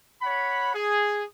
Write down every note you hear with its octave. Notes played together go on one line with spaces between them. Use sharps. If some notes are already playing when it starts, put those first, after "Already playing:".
C#5 F#5 B5
G#4